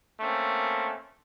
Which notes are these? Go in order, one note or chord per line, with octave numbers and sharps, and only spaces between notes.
A3 A#3 C4 C#4